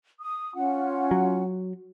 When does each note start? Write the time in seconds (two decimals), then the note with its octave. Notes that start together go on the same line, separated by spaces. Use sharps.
0.21 D#6
0.55 C#4 F4 F#5
1.11 F#3